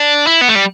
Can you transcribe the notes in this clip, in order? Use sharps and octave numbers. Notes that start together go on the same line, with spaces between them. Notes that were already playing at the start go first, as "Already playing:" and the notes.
Already playing: D4
E4
B3
A3
G3